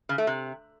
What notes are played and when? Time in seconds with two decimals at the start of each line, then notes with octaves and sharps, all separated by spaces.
0.09 C#3
0.18 A3
0.27 C3